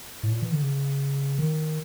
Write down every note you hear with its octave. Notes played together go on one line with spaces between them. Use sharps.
A2
A#2
E3
D3
C#3
D#3